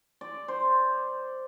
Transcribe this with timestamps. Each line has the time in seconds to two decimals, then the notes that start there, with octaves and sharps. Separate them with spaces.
0.21 D5
0.48 C5